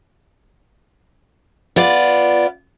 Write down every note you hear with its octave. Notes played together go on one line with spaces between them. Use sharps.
B3 F4 D5